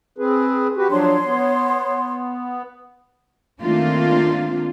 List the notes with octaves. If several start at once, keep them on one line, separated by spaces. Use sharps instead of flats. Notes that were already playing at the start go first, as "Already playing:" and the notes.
C4 G#4 B4
F#4 G4 B4
F3 F#3 D4 C#5 C6
B3
D#3 A3 A#3 C4 D4 F4